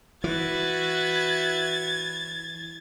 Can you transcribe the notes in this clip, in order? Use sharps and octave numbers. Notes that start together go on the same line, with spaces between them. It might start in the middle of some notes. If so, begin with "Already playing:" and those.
E3 F#4 B4 E5 G#6 A6